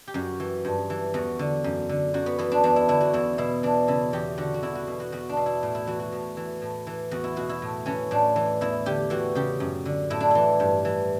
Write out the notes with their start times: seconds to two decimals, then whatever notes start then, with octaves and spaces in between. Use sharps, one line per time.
0.08 G4
0.14 F#2 F#4
0.40 E3
0.65 G2
0.90 E3
1.14 E2 F#4
1.39 D3
1.64 F#2
1.89 D3
2.14 F#2 F#4
2.26 B3
2.39 E3 B3
2.52 D4
2.64 E2 D4
2.76 E4
2.88 D3 E4
3.01 F#4
3.13 E2 E4
3.38 B2 E4
3.63 E3 D4
3.88 C#3 E4
4.13 E2 G4
4.38 D3 F#4
4.54 F#4
4.63 E2 E4
4.75 F#4
4.87 B2
5.00 F#4
5.12 E2 F#4
5.29 D4
5.37 B2
5.46 E4
5.63 A2
5.75 E4
5.87 E3 F#4
6.00 F#4
6.12 A2
6.37 E3
6.62 A2
6.87 E3
7.11 E2 F#4
7.24 E4
7.36 B2 F#4
7.49 E4
7.62 A2
7.86 E3 C#4
8.11 A2 D4
8.36 E3
8.61 E2 E4
8.86 D3 G4
9.10 E3 F#4
9.35 C#3 G4
9.60 F#2
9.86 D3
10.10 A2 E4
10.20 D4
10.31 E3 E4
10.60 G2
10.85 E3